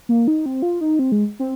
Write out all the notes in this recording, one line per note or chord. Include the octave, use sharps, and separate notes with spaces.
A#3
D#4
C4
F4
D#4
C4
G#3
C4